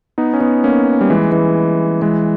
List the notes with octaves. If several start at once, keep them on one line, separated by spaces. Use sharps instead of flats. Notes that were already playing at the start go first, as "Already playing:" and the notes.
B3 D#4
C#4
B3 D#4
A#3 C#4
G3
E3 G#3
E3 G#3
E3 G#3